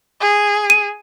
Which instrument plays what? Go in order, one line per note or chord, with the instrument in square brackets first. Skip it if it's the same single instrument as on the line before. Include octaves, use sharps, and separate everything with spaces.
[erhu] G#4
[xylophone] D#7